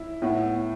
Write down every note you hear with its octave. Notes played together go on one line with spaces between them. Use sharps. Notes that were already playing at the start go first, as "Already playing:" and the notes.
Already playing: E4
A2 B3